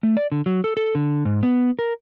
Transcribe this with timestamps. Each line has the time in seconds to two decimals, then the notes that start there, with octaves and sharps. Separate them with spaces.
0.03 A3
0.17 D5
0.32 D3
0.46 F#3
0.64 A4
0.77 A4
0.95 D3
1.25 G#2
1.43 B3
1.79 A#4